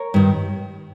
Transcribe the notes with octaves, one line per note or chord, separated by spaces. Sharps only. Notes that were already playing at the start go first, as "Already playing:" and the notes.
Already playing: A#4 C#5
G2 D#3